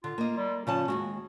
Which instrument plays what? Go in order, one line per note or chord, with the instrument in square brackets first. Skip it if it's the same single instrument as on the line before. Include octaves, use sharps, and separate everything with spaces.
[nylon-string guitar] D3 [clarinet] F4
[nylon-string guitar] A#3 D#5
[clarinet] G3
[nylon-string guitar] C#3 F3 A5 [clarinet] C#4
[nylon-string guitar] D#2 A#2 G#3 [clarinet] F#4